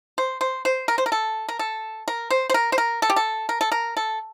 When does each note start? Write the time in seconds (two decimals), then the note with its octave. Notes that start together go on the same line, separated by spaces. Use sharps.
0.18 C5
0.41 C5
0.65 C5
0.88 A#4
0.98 C5
1.06 A#4
1.12 A4
1.49 A#4
1.59 A4
2.08 A#4
2.31 C5
2.50 C5
2.54 A#4
2.72 C5
2.78 A#4
3.02 A4
3.10 G4
3.16 A4
3.49 A#4
3.61 A4
3.72 A#4
3.97 A4